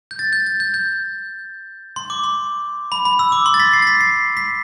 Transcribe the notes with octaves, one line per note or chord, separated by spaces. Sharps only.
G6
A6
G6
A6
G6
G6
C6
D6
C6
B5
B5
E6
D6
C6
A6
B6
C7
A6
B6
C7
B6